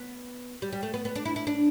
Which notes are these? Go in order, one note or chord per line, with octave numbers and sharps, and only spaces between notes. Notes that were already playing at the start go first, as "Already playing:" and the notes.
Already playing: B3
G3
G3
A3
B3
B3
D4
E4
E4
D4